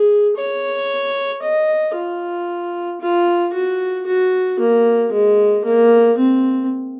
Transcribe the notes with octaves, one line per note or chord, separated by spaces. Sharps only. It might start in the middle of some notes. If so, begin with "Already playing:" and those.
Already playing: G#4
C#5
D#5
F4
F4
F#4
F#4
A#3
G#3
A#3
C4